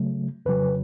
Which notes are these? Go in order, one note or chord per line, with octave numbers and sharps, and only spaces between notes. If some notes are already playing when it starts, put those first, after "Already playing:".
Already playing: C#3 F#3 A3
F2 C#3 F#3 B4